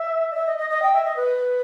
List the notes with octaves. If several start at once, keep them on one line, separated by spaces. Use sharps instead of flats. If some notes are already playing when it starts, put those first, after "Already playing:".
Already playing: E5
D#5
E5
D#5
D#5
D#5
G5
E5
D#5
B4